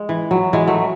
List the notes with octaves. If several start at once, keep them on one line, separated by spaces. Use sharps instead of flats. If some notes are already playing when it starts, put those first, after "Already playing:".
Already playing: G#3
E3
F#3
E3 G#3
F#3 A3